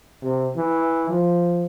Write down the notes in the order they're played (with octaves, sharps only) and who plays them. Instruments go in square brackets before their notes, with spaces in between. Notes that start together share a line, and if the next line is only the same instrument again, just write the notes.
[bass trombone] C3
E3
F3